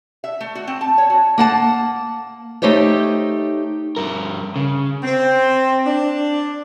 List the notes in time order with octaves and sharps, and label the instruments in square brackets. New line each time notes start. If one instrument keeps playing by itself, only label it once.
[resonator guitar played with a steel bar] E5
A3
F#4
C4
A5
C#5
F#4
[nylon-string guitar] A#3 F#5 A5
A3 D#4 G4 C5 C#5
[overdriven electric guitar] G2 A#4
C#3
[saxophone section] C4
D4